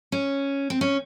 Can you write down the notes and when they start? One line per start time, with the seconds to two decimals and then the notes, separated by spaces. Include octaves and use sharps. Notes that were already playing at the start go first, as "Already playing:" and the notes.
0.12 C#4
0.70 C4
0.81 C#4